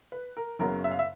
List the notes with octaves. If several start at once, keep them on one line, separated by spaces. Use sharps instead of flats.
B4
A#4
F#1 F#2 C#3 F#3 B3 A#4
E5
F5
E5